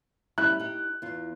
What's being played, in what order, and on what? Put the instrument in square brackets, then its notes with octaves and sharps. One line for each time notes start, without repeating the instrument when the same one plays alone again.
[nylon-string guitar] G3 C#4 E4 [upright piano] F#6
[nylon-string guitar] D#4 G4
E2 F4